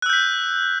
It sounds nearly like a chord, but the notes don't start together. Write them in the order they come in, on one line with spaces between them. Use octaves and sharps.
F#6 E6 G6 B6